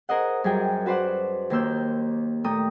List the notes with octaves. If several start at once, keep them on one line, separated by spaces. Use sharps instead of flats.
G#4 A#4 C5 D#5 F#5
F#2 G3 G#4 A#4 G5
F#4 B4 C5 D5 F#5
D#2 D#3 A#3 C6 E6 G6
A#2 A3 G5 A#5 D#6